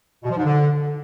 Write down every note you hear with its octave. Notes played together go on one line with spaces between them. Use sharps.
B2
F3
G#2
D3